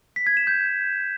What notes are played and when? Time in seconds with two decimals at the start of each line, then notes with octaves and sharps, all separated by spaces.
0.16 B6
0.27 G#6
0.37 E7
0.47 G6